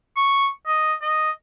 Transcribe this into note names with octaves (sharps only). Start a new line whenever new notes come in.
C#6
D#5
D#5